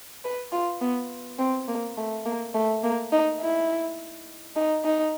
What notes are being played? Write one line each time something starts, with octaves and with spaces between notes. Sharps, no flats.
B4
F4
B3
C4
A#3
A3
A#3
A3
A#3
D#4
E4
D#4
D#4